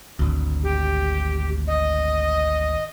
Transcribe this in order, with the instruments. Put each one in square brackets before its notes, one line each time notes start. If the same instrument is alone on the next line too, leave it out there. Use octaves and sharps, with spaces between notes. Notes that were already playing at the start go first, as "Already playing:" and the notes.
[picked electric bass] G#1 D2
[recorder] G4
D#5